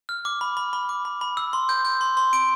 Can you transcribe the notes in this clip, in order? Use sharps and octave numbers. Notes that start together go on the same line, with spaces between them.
F6
D6
B5
B5
B5
D6
B5
B5
E6
C6
G6
G6
C6
C6
D7